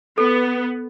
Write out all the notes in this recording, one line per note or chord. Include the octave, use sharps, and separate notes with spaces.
B3 A4